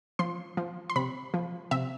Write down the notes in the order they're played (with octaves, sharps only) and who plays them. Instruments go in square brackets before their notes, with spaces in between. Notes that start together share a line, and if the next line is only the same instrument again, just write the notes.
[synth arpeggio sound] F3 C6
F3
C6
C3 B5
F3
C3 E5